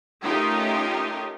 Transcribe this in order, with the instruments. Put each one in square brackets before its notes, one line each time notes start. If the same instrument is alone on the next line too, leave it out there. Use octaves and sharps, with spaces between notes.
[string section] A3 C#4 D#4 F4 G4 A#4